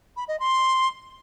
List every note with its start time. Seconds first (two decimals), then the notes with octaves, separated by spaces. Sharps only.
0.17 B5
0.28 D#5
0.40 C6